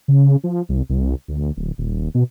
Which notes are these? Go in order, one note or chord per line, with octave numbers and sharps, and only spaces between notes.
C#3
F3
C2
C2
D2
D1
D#1
B2